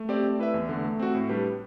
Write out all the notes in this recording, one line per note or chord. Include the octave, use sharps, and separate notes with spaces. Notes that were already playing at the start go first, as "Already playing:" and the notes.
Already playing: A3
C4 G4 D5
A3
E4 B4 E5
E2
D3 A3
A3
C4 F#4
A2
G3 D4 G4 B4